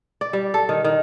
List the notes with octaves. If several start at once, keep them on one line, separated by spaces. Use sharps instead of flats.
D5
G3
A4
D#3
D#3